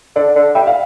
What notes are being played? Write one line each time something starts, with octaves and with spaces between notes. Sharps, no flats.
D3 D5
D3
G3 E5
F5